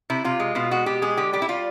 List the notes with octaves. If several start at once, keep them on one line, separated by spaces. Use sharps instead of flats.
C3 E4
C3 F4
G#3
B2 F4
G#3 F#4
B2 G4
G#3 G#4
D3 G4
G3 G4
E4
G3 F4